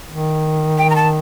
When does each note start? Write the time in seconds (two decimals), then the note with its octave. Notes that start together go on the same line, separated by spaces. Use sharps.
0.09 D#3
0.78 G5
0.90 A#5
0.96 A5